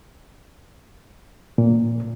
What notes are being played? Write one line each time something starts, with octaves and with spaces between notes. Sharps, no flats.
A#2